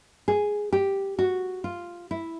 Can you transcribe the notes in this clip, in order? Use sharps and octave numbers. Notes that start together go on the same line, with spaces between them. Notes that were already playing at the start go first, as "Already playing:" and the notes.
G#4
G4
F#4
F4
E4